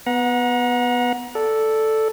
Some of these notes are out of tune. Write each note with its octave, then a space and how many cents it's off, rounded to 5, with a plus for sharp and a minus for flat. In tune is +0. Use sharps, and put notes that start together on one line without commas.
B3 +0 F#5 -25 A#5 +30
A4 +0 D5 +0